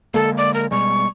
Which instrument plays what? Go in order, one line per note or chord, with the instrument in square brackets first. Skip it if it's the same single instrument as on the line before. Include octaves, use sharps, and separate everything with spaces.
[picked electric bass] D3 G#3 A#3 [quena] A4
[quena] D5
A#4
[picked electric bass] B2 G3 G#3 [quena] C#6